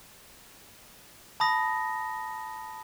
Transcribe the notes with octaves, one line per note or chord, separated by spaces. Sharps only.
A5 B5 D#6 A#6